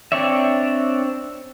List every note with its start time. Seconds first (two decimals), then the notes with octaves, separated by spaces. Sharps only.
0.12 C4 D4 C#5 D5 E5